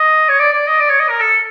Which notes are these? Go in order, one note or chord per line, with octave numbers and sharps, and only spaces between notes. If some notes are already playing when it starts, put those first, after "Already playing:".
Already playing: D#5
C#5
D5
D5
D#5
D5
C#5
D#5
A#4
A4